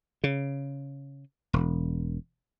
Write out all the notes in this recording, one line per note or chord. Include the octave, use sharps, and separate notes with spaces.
C#3
E1